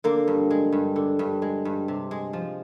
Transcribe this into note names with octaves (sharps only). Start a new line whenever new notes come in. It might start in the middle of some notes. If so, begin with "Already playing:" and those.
D3 A#3
G2
G#3
G2
D3
G2
G#3
G2
C3
G#3
F3